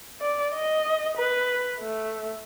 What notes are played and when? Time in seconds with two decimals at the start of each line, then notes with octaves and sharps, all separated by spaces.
0.21 D5
0.55 D#5
1.17 B4
1.80 A3